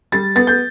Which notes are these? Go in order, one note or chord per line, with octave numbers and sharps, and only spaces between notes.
G3 A6
B3 A6
G6